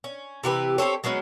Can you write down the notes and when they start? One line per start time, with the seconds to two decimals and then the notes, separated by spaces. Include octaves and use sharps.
0.04 C#4
0.43 C3 E3 G4 B4
0.78 C4 G4 A4 C#5
1.04 F#3 G#3 B3 C#4